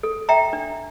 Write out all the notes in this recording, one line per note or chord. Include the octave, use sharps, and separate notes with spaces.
A4
E5 G5 A#5
D4